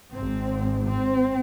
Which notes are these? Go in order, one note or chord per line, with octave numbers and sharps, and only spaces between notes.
G#1 G#2 C4
C4